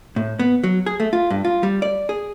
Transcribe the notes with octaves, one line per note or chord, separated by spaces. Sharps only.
A2
B3
F#3
G#4
A3
F4
G2
F4
G3
D5
G#4